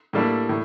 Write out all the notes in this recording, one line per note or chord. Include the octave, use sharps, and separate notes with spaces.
A2 G3 A#3 D4 A4
A2